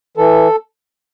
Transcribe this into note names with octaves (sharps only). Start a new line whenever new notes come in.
E3 A4